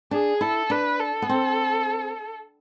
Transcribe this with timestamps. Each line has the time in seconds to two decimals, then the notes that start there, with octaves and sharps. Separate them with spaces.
0.11 D4 G#4
0.41 E4 A4
0.70 D4 B4
1.00 A4
1.22 B3
1.29 C4